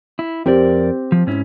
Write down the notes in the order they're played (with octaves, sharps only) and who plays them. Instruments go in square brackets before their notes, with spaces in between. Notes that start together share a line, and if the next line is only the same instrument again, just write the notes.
[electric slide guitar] E4
[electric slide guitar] F2 A#4 D5 [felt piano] C4 G4
[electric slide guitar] F3
G#2 C#4 E4